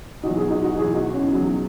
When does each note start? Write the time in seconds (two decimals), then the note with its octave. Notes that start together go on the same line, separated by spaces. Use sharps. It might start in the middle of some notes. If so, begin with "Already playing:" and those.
0.23 E2 B2 F#3 D#4 F#4
0.37 E4 G#4
0.50 D#4 F#4
0.64 D#4 F#4
0.77 E2 B2 F#3 E4 G#4
0.95 D#4 F#4
1.13 C#4 E4
1.31 E2 B2 F#3